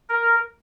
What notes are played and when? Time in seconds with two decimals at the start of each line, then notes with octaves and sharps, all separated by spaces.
0.09 A#4